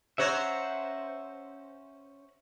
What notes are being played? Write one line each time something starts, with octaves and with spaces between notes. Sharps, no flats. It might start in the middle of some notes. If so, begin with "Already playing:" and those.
C#4 C5 C#5 E5 F#5 A#5